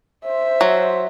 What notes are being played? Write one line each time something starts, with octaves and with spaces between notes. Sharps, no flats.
C5 E5
F#3